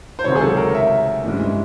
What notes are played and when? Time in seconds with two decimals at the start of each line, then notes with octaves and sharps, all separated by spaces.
0.19 C5
0.24 C#2 C3 D#3 F#3 C#5
0.35 G#4
0.41 A4
0.57 A#4
0.75 E5
1.24 G2 E3 G#3 C#4